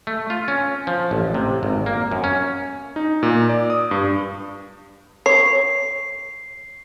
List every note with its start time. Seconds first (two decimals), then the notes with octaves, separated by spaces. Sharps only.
0.07 A3
0.30 F4
0.48 C#4
0.87 F3
1.11 A1
1.34 C3
1.63 G#1
1.86 A#3
2.11 F#2
2.24 C#4
2.96 D#4
3.23 A#2
3.49 D5
3.70 D#6
3.91 G2
5.26 C#5 C7